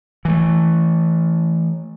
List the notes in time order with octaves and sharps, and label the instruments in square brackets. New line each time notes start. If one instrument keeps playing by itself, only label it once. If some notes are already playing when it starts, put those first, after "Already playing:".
[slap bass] E3 A3